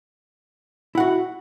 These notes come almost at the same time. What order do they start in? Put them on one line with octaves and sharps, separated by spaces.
E4 F#5 F#4